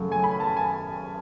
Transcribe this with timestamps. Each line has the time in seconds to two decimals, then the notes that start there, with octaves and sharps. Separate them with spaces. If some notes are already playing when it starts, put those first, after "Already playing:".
Already playing: F#2 C#3 F#3 A3
0.12 G#5
0.24 B5
0.40 A5
0.57 G#5